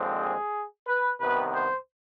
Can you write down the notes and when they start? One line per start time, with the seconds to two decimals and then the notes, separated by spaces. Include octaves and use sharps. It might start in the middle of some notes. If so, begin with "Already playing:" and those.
Already playing: D#2 D3 F3 G#3 C4
0.20 G#4
0.87 B4
1.20 C2 C3 D#3 B3 B4
1.54 C5